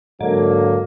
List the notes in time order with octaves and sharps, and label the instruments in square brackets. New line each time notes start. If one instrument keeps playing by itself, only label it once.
[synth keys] G#2 [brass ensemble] D3 F#3 A#3